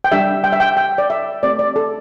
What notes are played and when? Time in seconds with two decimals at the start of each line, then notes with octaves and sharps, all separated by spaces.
0.04 G5
0.12 G3 D4 G4 E5
0.44 G5
0.52 E5
0.60 G5
0.77 G5
0.98 D5
1.10 E5
1.43 A3 C4 G4 D5
1.59 D5
1.76 A4